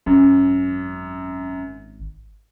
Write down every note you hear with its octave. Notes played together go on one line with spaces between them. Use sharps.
G#1 F#2